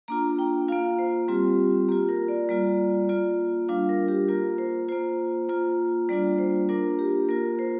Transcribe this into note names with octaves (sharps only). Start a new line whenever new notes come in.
A#3 D4 F4 A#5
G5
A#3 F4 F5
C5
G3 C4 F4 G4
A#3 F4 G4
A#4
D5
G3 A#3 F4
A#3 F4
G3 D4 F4 F5
A#4
G4
A#3 F4 A#4
C5
A#3 F4 C5
A#3 F4
G3 A#3 D4 F4 D5
C5
A#3 D4 F4 A#4
G4
A#3 F4 A#4
C5